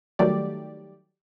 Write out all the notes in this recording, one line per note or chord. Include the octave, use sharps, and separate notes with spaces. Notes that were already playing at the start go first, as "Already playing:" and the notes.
D#3 F#3 G3 A3 G4 D5